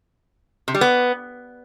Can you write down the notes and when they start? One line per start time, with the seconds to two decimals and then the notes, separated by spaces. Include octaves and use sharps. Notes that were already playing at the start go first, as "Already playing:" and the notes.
0.68 C3
0.75 G3
0.81 B3